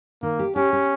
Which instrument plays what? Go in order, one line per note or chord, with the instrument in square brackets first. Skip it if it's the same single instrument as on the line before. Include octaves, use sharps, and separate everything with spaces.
[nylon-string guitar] D#3 [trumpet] A#3
[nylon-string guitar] G4
[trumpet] C#4 [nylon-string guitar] G4
[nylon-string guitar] G4